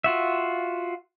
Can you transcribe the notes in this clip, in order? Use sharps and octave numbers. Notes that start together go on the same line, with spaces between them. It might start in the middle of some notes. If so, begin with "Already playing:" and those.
F4 F#4 E5